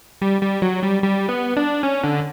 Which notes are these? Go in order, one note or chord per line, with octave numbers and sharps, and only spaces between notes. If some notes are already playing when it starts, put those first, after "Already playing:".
G3
G3
F#3
G3
G3
B3
D4
C#4
D3